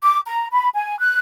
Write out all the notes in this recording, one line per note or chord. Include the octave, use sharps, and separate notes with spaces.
D6
A#5
B5
G#5
F#6